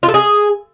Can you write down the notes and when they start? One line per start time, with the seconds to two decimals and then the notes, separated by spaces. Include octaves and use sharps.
0.03 F4
0.09 A4
0.14 G#4